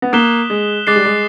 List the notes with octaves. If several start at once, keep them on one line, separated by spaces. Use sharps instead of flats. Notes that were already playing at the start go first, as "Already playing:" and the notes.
B3
A#3 D#6 F#6 B6 E7 G7
G#3
G#3 D6 F#6 A6 C7
G3
G#3